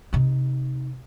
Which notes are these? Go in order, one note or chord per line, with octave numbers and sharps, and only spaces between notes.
C3 D#4